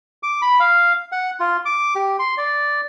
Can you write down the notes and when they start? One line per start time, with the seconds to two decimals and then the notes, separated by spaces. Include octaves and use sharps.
0.23 D6
0.42 B5
0.60 F5
1.12 F#5
1.40 F4
1.65 D6
1.95 G4
2.19 C6
2.38 D5